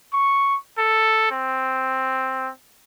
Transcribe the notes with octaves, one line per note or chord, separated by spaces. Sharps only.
C#6
A4
C4